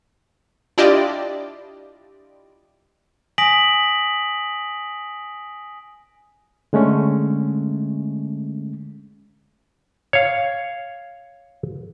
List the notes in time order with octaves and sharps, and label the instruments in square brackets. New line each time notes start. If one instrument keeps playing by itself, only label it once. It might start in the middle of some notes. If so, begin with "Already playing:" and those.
[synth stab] D4 E4 F4 G4 D5 D#5
[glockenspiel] G#5 D#6 A#6 B6 D7 F#7
[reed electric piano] D3 G#3 A3 C#4
[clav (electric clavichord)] C#5 F5